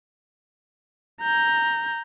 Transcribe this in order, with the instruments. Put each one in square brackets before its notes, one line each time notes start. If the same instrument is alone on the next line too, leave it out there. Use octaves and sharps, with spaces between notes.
[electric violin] A#5 G6